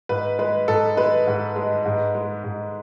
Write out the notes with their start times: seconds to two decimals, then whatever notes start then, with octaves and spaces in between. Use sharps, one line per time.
0.09 G#2 B4
0.39 G#3 B4
0.68 G#2 A4
0.97 G#3 B4
1.27 G#2
1.56 G#3
1.85 G#2
2.15 G#3
2.44 G#2